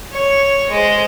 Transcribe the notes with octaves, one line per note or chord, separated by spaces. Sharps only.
C#5
G#3 C5